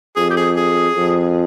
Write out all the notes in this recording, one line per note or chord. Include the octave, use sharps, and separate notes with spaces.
F2 G#4
G4
G#4
G#4
F2